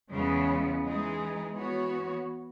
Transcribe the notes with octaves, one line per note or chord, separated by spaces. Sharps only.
E2 C#3 E3 G#3 B3
E3 G#3 D#4 G#4
E3 B3 F#4 C#5